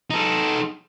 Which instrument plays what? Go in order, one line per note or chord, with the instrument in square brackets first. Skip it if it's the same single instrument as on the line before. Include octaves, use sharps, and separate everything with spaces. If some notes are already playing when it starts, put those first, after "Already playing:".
[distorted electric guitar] D#4 A4